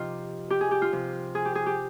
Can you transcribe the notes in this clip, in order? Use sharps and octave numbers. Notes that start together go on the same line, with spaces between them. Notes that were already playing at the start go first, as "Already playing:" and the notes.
Already playing: C3 F3 D#4 F4 G4
G4
G#4
G4
F4
C3 F3
G#4
G4
G#4
G4